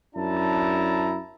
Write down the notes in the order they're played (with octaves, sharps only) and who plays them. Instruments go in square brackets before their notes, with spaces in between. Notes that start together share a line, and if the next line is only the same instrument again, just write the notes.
[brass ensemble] F#2 D4 E4 A5 A#5